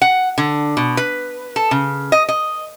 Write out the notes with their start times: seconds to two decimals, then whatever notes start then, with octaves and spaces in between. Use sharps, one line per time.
0.02 F#5
0.38 D3
0.77 B2
0.97 B4
1.56 A4
1.71 C#3
2.12 D#5
2.29 D#5